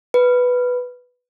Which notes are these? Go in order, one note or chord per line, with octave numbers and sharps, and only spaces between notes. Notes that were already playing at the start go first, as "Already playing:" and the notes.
B4